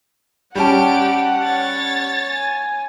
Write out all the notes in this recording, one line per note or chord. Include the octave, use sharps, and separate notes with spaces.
G3 C#4 G4 F#5 A5 D7
C#5 A6
G#5